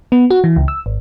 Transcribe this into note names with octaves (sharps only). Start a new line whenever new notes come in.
B3
F#4
E3
C#2
E6
G#1